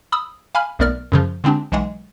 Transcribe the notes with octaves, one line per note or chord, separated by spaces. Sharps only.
B5 D#6 E6
F5 G#5 B5 F6
B1 A3 B3 A#4 D5 F6
F#2 C#3 F3
D3 G#3 C4 D4 G4
B1 E3 G#3 F#5